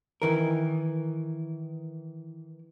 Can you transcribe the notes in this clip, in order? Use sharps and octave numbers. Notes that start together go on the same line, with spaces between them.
D#3 E3 A#4